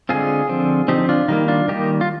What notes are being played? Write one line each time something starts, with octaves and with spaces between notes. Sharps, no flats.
D3 G#3 C4 F4 G#4
D3 F3 C4
D3 F3 C4 D#4 G4
D4 F4
D#3 G3 A#3 D#4
D4 F4
D#3 G3 A#3 D#4 G4
F4